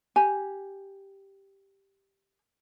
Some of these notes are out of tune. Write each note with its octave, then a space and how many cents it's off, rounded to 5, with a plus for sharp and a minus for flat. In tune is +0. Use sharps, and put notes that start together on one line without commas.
G4 +0 G#5 +0